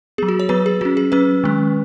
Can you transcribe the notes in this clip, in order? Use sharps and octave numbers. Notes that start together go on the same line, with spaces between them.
F#3 B3 G#4
F#4
C#5
F#3 B3 B4
G#4
F#3 C#4 F#4
G#4
F#3 C#4 B4
D#3 G#3 C#4